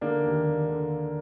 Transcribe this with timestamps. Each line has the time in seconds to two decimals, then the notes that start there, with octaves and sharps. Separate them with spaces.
0.01 D3 A#3 D4
0.24 D#2
0.46 D#2
0.69 D3